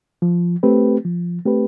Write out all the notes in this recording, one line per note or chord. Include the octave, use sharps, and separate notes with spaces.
F3
A3 C4 G4 B4
F3
A3 C4 G4 B4